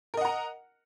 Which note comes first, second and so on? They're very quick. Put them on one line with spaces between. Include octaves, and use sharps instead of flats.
A#4 D#5 F#5 A#5